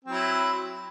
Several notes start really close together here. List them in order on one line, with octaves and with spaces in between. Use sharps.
C4 F#3 E4